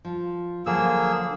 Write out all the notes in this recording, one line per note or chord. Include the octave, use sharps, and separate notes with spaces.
F3
D3 F3 F#3 A#3 G#4 E6